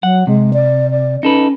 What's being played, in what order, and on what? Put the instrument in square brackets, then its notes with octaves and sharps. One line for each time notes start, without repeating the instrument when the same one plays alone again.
[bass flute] F#3 [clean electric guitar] F#5
[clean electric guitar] C3 [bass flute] G#3
[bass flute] D5
D5
[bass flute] C#4 [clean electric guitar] D#4 A4 B4